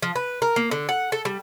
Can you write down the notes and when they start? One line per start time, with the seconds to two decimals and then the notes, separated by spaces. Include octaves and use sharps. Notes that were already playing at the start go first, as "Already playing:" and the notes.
0.02 F3
0.16 B4
0.42 A#4
0.56 A#3
0.71 D3
0.89 F#5
1.12 A4
1.25 G3